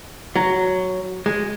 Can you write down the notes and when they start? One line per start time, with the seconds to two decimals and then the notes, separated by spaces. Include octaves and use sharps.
0.36 F#3
1.26 G#3